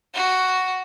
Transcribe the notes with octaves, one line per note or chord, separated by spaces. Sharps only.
F#4